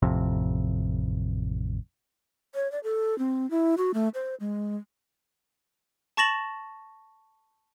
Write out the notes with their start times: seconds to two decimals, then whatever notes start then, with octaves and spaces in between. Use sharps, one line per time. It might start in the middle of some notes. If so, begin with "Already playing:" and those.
0.02 A1 F2 C3
2.55 C#5
2.72 D5
2.84 A4
3.19 C4
3.51 E4
3.77 F#4
3.94 A3
4.14 C5
4.40 G#3
6.17 A5 C#6 A6 A#6 E7 F#7